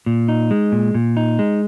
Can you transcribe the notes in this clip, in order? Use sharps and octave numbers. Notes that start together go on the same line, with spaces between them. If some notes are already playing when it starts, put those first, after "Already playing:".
A#2
D#4
G#3
A#2
A#2
D#4
G#3